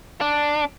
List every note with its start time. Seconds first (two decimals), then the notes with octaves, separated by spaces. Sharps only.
0.21 D4